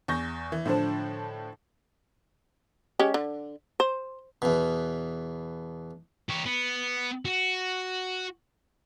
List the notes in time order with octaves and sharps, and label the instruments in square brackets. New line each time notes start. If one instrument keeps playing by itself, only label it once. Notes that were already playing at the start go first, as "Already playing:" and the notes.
[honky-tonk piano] E2 C#6 G6 A#6
E3
A2 D3 F3 D4 C5
[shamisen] G#3 C#4 G4
D3
C5
[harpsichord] E2 B2
[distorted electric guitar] G4 C#5
B3
F#4